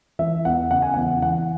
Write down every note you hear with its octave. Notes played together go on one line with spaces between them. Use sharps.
E3 E5
E2 F#5
C#3 F#5
G#5
E2 F#5
E3 F#5